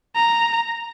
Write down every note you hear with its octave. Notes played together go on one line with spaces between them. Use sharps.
A#5